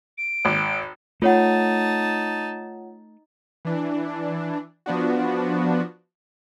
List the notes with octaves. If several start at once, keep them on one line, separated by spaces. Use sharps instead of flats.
D7
G#1
A3 D#4 F4 C#5 F#5 A5
E3 D4
F3 B3 D4 F#4